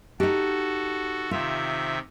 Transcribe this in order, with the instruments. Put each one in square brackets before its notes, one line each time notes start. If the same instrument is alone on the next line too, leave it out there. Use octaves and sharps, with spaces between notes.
[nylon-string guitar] D#4 G4 [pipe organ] F#4 A4
[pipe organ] C3 D#3 E5 [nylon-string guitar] F4